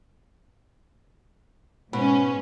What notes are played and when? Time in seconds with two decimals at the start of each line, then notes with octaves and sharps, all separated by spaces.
1.93 G#2 B2 C#4